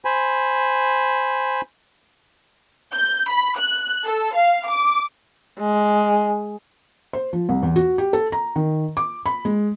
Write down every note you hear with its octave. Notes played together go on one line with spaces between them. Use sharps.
C5 G#5 B5
G6
B5
F#6
A4
F5
D6
G#3
C5
F3
C2
E2
F#4
G4
A4
A#5
D#3
D6
B5
G#3